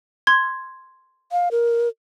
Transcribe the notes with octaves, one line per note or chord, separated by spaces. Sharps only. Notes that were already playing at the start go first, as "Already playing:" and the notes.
C6 G#6
F5
A#4